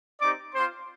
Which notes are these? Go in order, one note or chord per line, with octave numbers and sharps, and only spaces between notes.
C4 D#4 G4 D5 D6
C4 F4 C5 C6